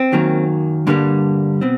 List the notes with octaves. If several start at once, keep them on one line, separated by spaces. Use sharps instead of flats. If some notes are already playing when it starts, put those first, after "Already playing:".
Already playing: C4
F#2 D#3 F#3 A#3
G2 D3 G3 A#3
B2 C4